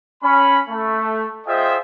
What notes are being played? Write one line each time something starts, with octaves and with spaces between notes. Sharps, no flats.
C#4 B5
A3
F4 G#4 C5 D#5 E5 G5